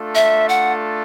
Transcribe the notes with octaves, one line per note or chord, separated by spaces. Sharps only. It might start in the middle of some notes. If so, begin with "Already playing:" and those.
Already playing: A3 D4 F4 A4
E5
F#5